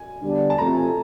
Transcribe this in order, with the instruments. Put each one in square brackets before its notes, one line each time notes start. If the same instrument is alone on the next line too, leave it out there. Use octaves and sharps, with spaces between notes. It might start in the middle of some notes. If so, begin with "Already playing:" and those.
Already playing: [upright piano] G#5
[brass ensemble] D3 G3 B3 D4
[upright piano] A5
[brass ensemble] C3 F3 A3 [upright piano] A#5
[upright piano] G#5